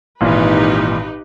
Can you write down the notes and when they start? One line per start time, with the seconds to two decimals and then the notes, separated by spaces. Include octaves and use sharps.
0.21 G#1 A#2 E3 D#4 G4 B4